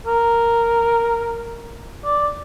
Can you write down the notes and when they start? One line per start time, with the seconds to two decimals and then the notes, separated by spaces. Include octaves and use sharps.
0.06 A#4
2.04 D5